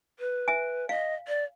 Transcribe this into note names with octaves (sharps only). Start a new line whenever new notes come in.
B4
E5 G#5
D#5 F5
D5